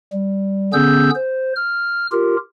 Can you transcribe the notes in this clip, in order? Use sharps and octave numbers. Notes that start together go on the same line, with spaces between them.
G3
D3 B3 C#4 G#4 E6 G6
C5
F6
F4 G4 A#4